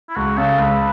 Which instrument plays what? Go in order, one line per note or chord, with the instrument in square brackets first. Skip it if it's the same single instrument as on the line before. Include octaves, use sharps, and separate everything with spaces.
[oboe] E4
[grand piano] C#2 [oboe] F#4
[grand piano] C#3 [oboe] A4
[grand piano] C#2 [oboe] B4